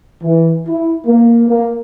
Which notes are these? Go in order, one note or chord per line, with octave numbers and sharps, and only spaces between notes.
E3
E4
A#3
A#3